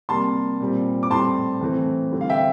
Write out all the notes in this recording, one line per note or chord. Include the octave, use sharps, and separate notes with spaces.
C3 G3 A#3 A5 C6
A#2 G3 C4
D6
A2 G3 C4 A5 C6
E3 A3 C4
D3 G3 C4
F5
E5 G5